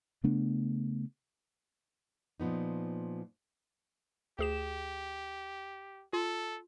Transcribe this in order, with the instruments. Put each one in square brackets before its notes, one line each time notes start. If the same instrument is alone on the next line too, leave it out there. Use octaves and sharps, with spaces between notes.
[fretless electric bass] C#3 A3 B3 D4
[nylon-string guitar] A#2 F3 B3 D#4
[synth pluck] D2 G#4 E7 [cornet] G4
[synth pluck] F4 [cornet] A4